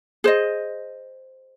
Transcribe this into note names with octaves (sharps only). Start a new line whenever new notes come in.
G#4 C5 D#5